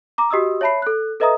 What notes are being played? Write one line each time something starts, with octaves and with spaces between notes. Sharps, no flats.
A#5 D6
F#4 G4 D#5 D#6 E6
C#5 E5 A5 B5 C7
A4 F#6
A4 B4 D#5 E5 A#5 D#6